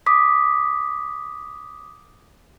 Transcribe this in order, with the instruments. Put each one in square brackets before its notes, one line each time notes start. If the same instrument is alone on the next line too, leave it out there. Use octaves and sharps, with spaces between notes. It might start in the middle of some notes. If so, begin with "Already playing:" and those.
[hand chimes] D6 D#6 B6